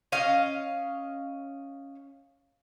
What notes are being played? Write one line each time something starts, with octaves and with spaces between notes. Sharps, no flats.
C#4 D#5 F5